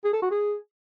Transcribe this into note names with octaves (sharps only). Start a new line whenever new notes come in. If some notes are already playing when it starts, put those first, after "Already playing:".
G#4
A4
F#4
G#4